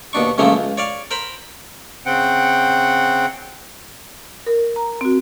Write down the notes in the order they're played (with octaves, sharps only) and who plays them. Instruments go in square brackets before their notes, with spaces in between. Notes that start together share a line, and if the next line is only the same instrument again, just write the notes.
[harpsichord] D#2 B2 D4 C#6
C#2 F#2 C#3 F3 A3 A#3
C#2
C#5 D5 F5
A#4 C5 B5
[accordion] C#3 C4 F#5 G5
[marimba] A#4
A#5
C4 F#4